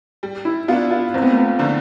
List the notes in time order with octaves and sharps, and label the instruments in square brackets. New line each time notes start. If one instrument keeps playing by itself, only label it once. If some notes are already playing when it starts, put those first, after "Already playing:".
[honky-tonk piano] G3
[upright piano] E4
[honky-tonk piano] B3 D4 [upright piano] F4
[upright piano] F4
[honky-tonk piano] E2 [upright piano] C4
[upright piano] B3
A3
B3
[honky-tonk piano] D3 F3 A3 D4